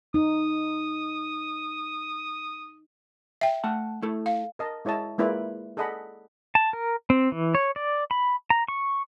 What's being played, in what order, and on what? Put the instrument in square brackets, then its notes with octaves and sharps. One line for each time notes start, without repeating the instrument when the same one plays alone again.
[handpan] D#4 [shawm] D#6
[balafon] E5 G5
[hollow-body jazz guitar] A3 F#5 A5
A3 E4 A4
[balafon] F5
[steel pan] A#4 D#5 A5
G#3 E4 C#5 D#5 A5
G#3 A#3 E4 F4 B4 D5
G#4 A4 D5 D#5 F#5 B5
[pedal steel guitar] A5
A#4
C4
E3
C#5
D5
B5
A#5
C#6